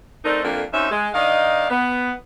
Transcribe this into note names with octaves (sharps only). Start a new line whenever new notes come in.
A3 C4 D4 D#4 A#4
F2 A3 A#3 D4
F#2 C4 C#4 D#4 E5
G#3
D#3 D4 D#4 D#5 F5
B3